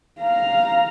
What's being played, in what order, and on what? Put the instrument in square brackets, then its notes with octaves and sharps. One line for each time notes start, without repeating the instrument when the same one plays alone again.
[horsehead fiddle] F5 A#5